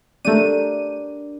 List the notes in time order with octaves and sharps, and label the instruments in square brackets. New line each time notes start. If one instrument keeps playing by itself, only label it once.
[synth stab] A3 D#7 [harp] D4 G4 A#4